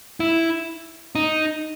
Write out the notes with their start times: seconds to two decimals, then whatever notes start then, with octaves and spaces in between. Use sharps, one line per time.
0.20 E4
1.15 D#4